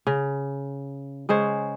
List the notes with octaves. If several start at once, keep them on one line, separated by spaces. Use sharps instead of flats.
C#3
C#3 G#3 C5 C#5